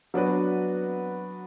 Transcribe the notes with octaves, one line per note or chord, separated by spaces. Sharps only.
F#3 B3 D4 F#4 B4